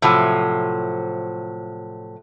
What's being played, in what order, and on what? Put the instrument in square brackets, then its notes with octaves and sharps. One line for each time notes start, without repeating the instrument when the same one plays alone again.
[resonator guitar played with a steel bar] A2 C3 F3 F#3